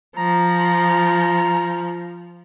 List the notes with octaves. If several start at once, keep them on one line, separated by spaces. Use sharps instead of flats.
F3 A#5